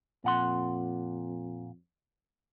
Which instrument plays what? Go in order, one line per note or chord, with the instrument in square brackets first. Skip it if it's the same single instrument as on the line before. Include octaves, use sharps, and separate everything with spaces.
[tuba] F2 [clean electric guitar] A#2 F#5 C6